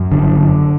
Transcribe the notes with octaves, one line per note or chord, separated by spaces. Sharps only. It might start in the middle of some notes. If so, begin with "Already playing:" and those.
Already playing: F#2
G1 D3